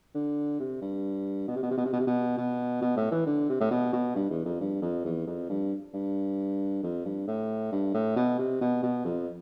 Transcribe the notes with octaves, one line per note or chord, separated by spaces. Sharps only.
D3
C3
G2
B2
C3
B2
C3
B2
C3
B2
C3
B2
B2
B2
A2
E3
D3
C3
A2
B2
B2
G2
E2
F2
G2
F2
E2
F2
G2
G2
F2
G2
A2
G2
A2
B2
C3
B2
B2
F2